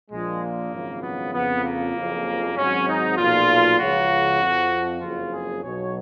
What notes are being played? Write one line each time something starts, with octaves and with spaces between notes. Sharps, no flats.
A#1 A#2 F3 G#3
A#3
G#1 F#2 C#3 F3
B3
F2 C#3 F3 B3
A#3
F#1 F2 C#3 F3
G#1 G#2 F#3 C#4
D#4
B1 A#2 F3 F4
C#2 C#3 F3 F#4
F2 F3
F#1 F2 C#3 F3 F4
G#4
B1 B2 F#3 C#5